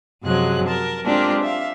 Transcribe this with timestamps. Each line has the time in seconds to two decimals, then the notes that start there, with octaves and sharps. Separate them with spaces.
0.24 F#2 C3 F3 F#3 G#3 F#6
0.68 A#4 A5
1.06 G#3 C4 D4 F4 G4 A#4
1.43 E5 F5